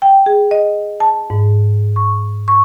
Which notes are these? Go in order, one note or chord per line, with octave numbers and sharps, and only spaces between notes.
G5
G#4
D#5
A5
G#2
C#6
C#6